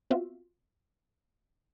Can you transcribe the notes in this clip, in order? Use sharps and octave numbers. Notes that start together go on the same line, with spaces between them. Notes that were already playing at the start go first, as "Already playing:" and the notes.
B3 C4 F4 F#4 E5